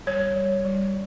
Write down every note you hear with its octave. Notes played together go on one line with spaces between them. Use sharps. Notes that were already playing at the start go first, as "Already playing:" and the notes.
G3 C#5
G3
G3